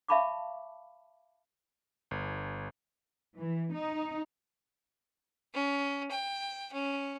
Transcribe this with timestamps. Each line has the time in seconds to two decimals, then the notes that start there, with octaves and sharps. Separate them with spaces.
0.08 E5 F5 A5 B5 C#6 D6
2.11 G1
3.37 E3
3.74 D#4
5.54 C#4
6.11 G5
6.73 C#4